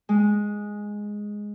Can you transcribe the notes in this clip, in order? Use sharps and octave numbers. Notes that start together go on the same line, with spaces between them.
G#3